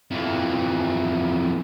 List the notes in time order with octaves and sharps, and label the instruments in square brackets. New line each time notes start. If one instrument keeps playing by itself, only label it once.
[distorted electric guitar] F2 E3